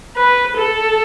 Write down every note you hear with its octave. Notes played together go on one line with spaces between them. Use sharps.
B4
A4